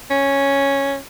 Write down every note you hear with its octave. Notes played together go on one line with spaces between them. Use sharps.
C#4